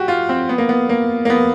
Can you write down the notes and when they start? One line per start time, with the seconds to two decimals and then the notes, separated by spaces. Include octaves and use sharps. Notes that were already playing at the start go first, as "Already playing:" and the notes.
Already playing: F#4 G4
0.08 F4
0.29 C4
0.49 B3
0.58 A#3
0.69 B3
0.89 A#3
1.25 A#3
1.30 B3